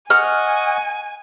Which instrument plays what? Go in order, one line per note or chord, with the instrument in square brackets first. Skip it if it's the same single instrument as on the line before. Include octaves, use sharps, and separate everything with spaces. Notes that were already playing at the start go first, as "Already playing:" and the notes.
[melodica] D#5 F#5 C#6 [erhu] G#5 [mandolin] F6